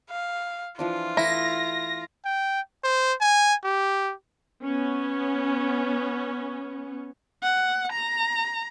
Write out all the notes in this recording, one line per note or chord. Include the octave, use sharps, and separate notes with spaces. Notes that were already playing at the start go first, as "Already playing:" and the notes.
F5
E3 F3 D4 F4
E3 A3 E4 A#6
G5
C5
G#5
G4
B3 C#4
F#5
A#5